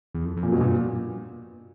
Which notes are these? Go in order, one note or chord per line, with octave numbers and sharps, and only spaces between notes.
E2
F2
F2
A#2
F#2 B2
G2 A#2